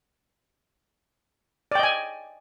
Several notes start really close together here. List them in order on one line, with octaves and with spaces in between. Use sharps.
D5 G5 D#5 G#5